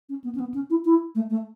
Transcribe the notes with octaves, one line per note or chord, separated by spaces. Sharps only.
C#4
B3
C#4
B3
C#4
E4
E4
A3
A3